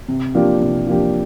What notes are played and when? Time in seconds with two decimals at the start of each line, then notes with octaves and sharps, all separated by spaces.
0.08 C3
0.35 F3 A#3 D4 G4
0.61 C3
0.87 F3 A#3 D4 G4